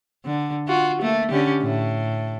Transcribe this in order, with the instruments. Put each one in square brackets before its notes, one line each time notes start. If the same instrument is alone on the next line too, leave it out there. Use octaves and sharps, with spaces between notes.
[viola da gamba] D3
F4 F#4
A3 A#3
D3 C#4 G4
A2